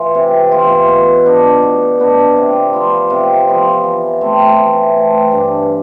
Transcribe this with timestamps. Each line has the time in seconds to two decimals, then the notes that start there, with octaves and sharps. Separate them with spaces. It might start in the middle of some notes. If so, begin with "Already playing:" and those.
Already playing: E3 F4
0.15 C3
0.52 E3 B3 F4
0.88 B2
1.26 B3 D4
1.63 B2
1.99 B3 D4
2.37 C3
2.73 F3 B3 F4
3.10 C3
3.47 F3 B3 F4
3.84 E3
4.21 A3 C4
4.58 E3
4.96 A3 C4
5.32 G2